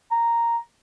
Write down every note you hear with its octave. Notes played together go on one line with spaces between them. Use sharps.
A#5